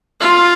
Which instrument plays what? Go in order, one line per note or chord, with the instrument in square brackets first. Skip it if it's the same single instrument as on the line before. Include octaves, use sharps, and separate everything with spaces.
[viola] F4